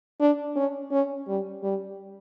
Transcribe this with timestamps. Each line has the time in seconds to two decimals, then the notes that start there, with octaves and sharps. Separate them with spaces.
0.20 D4
0.56 C#4
0.92 C#4
1.28 G3
1.63 G3